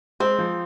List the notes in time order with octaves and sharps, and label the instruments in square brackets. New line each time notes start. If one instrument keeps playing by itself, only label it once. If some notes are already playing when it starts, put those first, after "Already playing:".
[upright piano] G#3 [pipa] C4
[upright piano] F3